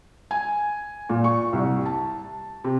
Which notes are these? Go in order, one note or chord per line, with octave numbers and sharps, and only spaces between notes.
G#5
A#2
C#6
C2
A5
C3